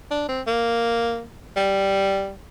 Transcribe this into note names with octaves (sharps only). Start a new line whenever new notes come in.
D4
C4
A#3
G3